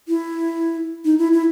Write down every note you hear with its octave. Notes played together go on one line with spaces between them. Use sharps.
E4
D#4
E4
E4